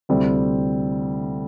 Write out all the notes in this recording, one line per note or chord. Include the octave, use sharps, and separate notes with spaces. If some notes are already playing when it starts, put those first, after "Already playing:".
D2 C3 G3 C4 E4